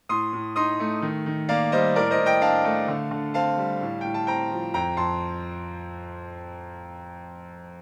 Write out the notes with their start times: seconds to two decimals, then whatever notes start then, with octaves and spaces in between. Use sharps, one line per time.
0.09 A2 C6 D#6
0.33 A2
0.56 D#4 C6 D#6
0.80 A3
1.02 D#3
1.26 D#3
1.49 A#3 D5 F5
1.72 G3 C5 D#5
1.95 A2 A#4 D5
2.11 C5 D#5
2.19 A2
2.26 D#5 G5
2.42 D4 F5 A5
2.65 A3
2.88 D3
3.11 D3
3.34 C4 F5 A5
3.58 G3
3.81 A2
4.01 A2 G5
4.14 A5
4.27 C4 G5 A#5
4.51 F3
4.74 F2 G5 A#5
4.97 F2 A5 C6